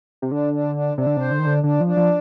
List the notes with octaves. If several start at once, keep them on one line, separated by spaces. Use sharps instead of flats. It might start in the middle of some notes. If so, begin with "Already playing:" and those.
C3
D3 D4
D4
D4
C3 D4
D3
C3 C5
D3
D#3 D4
D3
D3 D4
F3
D4
F3